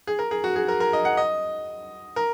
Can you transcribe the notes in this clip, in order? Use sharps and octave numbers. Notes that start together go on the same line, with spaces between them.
G#4
A#4
G#4
F#4
G#4
A#4
A#4
D#5
F#5
D#5
A#4